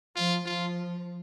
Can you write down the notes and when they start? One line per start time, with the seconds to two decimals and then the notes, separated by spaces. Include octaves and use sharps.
0.16 F3 F4
0.46 F3 F4